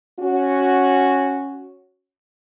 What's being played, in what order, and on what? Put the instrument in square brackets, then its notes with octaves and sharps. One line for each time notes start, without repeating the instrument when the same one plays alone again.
[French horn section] C#4 F#4